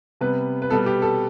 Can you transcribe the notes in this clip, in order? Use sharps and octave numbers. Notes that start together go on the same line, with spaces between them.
C3 G3 B3 B4
B4
B2 G3 B3 A4
G4
A4